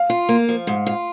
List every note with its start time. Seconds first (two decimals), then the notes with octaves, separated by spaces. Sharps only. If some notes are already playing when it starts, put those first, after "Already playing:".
Already playing: F5
0.10 F4
0.29 A#3
0.49 F3
0.67 G#2
0.86 F4